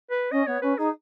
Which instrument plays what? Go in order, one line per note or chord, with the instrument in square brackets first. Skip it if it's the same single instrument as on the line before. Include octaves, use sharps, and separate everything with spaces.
[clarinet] B4
[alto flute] C#4 [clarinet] D#5
[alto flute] B3 [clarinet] C#5
[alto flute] C#4 [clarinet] B4
[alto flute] D#4 [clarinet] G#4